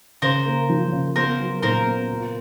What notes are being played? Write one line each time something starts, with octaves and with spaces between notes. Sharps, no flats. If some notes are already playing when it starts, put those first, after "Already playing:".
C#3 A#4 C5
A#3
F3
C#3
B3 A#4 C5
F#3
A#2 A#4 C5
B3
F4